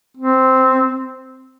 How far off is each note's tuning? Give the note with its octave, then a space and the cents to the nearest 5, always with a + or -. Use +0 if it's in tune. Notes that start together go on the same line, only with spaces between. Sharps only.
C4 -5